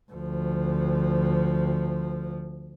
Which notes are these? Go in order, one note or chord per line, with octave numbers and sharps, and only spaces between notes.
D2 F3